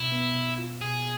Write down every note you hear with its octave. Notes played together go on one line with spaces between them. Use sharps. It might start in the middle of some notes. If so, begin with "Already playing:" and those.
Already playing: B2 E4
B3
B2
F4
B2 G#4